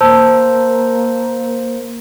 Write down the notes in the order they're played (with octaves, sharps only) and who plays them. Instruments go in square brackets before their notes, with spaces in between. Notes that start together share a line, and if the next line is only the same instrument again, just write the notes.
[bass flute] A#3 [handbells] C5 [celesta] A5 E6